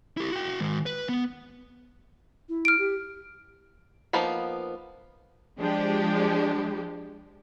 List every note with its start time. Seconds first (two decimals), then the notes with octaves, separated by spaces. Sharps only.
0.17 E4 G4
0.32 F#4 G5
0.60 D#3 G#3
0.86 B4
1.09 B3
2.49 E4
2.65 F6 D7
2.79 G4
4.13 F3 A#3 B3 D#4 B5
5.58 F3 G#3 D4 G4